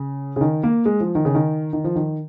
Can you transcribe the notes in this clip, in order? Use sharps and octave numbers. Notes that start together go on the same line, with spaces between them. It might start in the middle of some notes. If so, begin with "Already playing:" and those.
Already playing: C#3
C#3
D#3
A#3
G#3
F3
D#3
C#3
D#3
D#3
F3
D#3